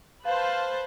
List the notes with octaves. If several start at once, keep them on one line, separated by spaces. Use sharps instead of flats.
B4 C5 F5 A5